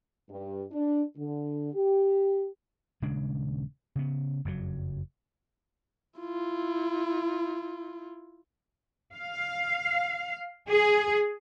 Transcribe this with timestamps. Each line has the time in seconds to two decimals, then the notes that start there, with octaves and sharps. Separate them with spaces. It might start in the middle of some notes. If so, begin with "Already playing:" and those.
0.30 G2
0.71 D4
1.17 D3
1.74 G4
3.02 D#1 C#3 G#3 D4
3.95 C#3 B3
4.45 F#1 F2 B2 F#3
6.20 E4 F4
9.14 F5
10.69 G#4